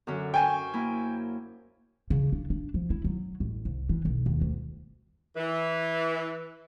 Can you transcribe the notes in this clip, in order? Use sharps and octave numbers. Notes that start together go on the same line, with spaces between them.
F#2 D3 C#4
C5 G5 G#5 C#6
A#3 E4
C#3
D4
D4
F3
E4
F#3
A1
C2
E3
B1
D#2
D2
E3